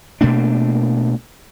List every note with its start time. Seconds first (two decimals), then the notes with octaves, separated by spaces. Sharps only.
0.21 B2 A3 A#3 D4